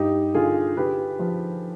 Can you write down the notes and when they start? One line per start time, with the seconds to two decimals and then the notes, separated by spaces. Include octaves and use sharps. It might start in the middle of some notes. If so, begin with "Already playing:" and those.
Already playing: G2 D#4 G4
0.35 D3 F4 G#4
0.77 D3 G4 B4
1.19 F3